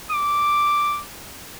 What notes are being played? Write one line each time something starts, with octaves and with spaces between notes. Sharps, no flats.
D6